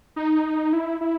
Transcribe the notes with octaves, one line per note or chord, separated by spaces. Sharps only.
D#4
E4
E4